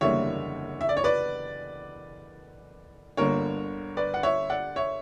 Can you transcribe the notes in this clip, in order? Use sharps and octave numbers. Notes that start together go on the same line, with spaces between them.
F#1 E2 D3 G3 A#3 C#5 E5
E5
D5
C#5
B4 D5
G1 G2 D3 A#3 A#4 C#5
B4 D5
F#5
C#5 E5
D5 F#5
C#5 E5